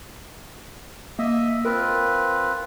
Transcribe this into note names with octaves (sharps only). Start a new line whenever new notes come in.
A#3 D#5 E5
C4 F4 A#4 B4